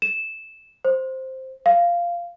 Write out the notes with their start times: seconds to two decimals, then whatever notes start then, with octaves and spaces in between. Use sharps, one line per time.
0.02 E7
0.85 C5
1.66 F5